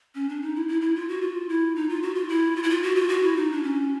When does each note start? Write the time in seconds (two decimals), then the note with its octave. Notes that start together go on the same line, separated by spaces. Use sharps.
0.15 C#4
0.29 D4
0.42 D#4
0.55 E4
0.68 E4
0.81 E4
0.96 F4
1.09 F#4
1.21 F4
1.49 E4
1.76 D#4
1.89 F4
2.03 F#4
2.15 F4
2.29 E4
2.56 F4
2.63 E4
2.70 F4
2.83 F#4
2.95 F4
3.09 F#4
3.23 E4
3.36 D#4
3.52 D4
3.63 C#4